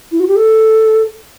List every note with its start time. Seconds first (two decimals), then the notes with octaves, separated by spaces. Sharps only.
0.12 E4
0.20 F#4
0.28 G4
0.36 A4